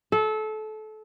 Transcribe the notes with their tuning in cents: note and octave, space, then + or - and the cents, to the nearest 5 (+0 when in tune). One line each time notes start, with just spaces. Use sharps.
A4 -25